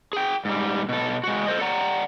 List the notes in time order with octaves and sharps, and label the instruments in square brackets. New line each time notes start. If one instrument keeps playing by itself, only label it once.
[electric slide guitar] G#4 G5
G#2 G3
B2 A4
G#3 F#4
A4 B4 C5 D#5
D5 F#5 A#5